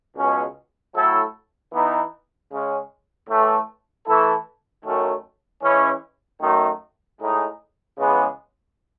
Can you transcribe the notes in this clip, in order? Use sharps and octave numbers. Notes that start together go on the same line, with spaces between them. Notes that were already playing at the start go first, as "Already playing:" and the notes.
C#2 B2 G#3 C#4
A2 F#3 A3 E4 A4
E3 B3 D#4
C#3 G#3 C#4
A2 E3 A3
E3 A3 E4 A4
F#2 D#3 F#3 A3 C#4
E3 G#3 C#4
F#2 D#3 A3
A2 G#3 D#4 G#4
C#3 E3 G#3 B3